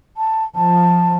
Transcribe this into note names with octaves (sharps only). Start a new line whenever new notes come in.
A5
F3 A5